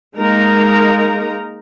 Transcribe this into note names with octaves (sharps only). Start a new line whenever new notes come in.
G#3 A#3 D#4 A#4 A#5